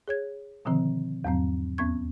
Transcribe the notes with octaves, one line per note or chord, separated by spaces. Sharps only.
G#4 C#5 G#6
B2 D3 D#3 F3 C4
E2 G#2 F#3 C4
D#2 B3 C#4 C#6 G#6